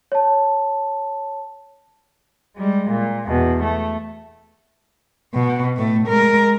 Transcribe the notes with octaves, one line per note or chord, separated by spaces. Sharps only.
C#5 A5
G3 G#3
A#2
E2 B2
A3
B2
A2 A3
G#3 A#4